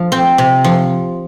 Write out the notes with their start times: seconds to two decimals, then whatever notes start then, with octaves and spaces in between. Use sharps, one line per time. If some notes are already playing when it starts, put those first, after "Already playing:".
Already playing: F3 F4
0.12 C4
0.38 C3
0.64 F3